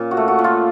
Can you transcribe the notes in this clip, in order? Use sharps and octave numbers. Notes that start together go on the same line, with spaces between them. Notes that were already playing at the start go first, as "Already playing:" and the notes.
Already playing: A#2 C#4
F#4
A3
F#4
A#2
F4